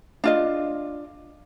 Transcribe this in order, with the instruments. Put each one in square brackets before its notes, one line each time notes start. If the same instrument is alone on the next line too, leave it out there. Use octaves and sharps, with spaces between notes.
[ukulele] D4 F4 D#5